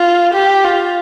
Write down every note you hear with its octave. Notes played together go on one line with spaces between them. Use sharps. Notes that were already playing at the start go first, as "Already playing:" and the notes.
Already playing: F4
G4
F4